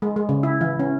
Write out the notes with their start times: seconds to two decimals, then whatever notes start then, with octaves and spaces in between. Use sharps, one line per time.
0.02 G#3
0.16 G#3
0.29 C#3
0.43 E4
0.61 E3
0.79 C#4